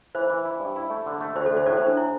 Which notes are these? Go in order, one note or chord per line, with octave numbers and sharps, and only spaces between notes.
E3 C5
E3
E4
G2
E4
A3
D3
A3
D2 C5
A4
D2
C5
A2 A4 D5
C5
A2
D4
E4